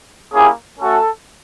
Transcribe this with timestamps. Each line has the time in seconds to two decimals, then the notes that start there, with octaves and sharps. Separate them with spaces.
0.32 A#3 C#4 E4 G4 G#4
0.80 A3 C#4 F#4 A4